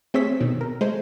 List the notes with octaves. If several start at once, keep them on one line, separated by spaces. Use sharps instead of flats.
A3 C4 G#4 C#5 E6 B6
B2 D#3
A#4
G#3 A3 C5